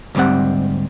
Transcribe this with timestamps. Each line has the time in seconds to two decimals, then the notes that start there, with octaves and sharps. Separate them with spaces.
0.15 D2 G#2 G3 C4 F#5